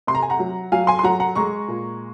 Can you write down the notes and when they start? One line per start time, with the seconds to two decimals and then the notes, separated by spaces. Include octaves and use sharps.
0.07 C3 C6
0.15 A#5
0.22 G#5
0.30 F#5 A#5
0.39 F#3
0.72 F#3 F5 G#5
0.87 G#5 C6
0.99 C6
1.03 F#3 F#5 A#5
1.20 F#5 A#5
1.36 G#3 A#5 C#6
1.68 A#2